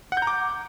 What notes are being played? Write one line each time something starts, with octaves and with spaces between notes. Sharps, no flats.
F#5
G6
A#5
D6